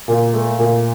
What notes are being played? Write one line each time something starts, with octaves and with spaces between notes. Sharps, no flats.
A#2
A3
A#2